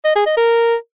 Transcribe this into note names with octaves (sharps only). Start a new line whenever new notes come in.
D#5
G#4
D#5
A#4